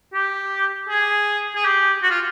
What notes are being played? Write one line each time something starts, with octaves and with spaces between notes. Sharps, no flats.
G4
G#4
G#4
G4
F#4
F4